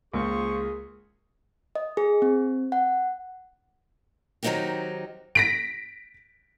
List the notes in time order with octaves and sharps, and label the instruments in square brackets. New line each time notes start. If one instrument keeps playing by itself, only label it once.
[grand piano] C#2 [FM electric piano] G#3 A#3 [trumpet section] F4 C5 C#6 [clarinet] G#4
[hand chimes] D#5
G#4
C4
F#5
[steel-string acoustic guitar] D#3 F#3 C4 D#4 F#4 G4
[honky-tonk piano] A#6 B6 D7